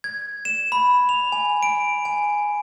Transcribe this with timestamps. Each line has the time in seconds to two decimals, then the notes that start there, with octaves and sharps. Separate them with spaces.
0.04 G#6
0.45 E7
0.72 B5
1.09 F7
1.32 G#5
1.63 D7
2.05 G#5